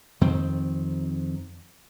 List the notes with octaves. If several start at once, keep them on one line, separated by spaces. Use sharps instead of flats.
F2 D#3 C4